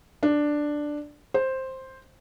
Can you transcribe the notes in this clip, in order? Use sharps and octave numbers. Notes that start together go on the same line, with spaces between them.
D4
C5